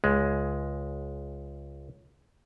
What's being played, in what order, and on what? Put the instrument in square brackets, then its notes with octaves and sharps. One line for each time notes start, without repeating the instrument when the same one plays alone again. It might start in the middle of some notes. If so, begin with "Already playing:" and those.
[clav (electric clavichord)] C#2 G#3